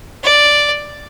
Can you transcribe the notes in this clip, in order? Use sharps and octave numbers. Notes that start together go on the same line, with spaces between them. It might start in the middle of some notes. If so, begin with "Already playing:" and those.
D5